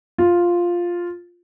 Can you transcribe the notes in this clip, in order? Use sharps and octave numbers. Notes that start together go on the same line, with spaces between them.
F4